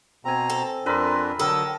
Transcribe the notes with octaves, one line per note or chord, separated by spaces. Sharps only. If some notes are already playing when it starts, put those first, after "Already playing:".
B2 C4 G#5 A#5
A4
F2 D4 A#4 B4 E5 C6
D3 F#3 A4 A#4 G5 D#6